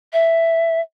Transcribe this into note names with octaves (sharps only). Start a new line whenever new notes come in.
E5